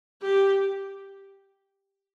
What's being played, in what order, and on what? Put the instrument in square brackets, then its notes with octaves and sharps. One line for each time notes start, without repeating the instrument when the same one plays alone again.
[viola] G4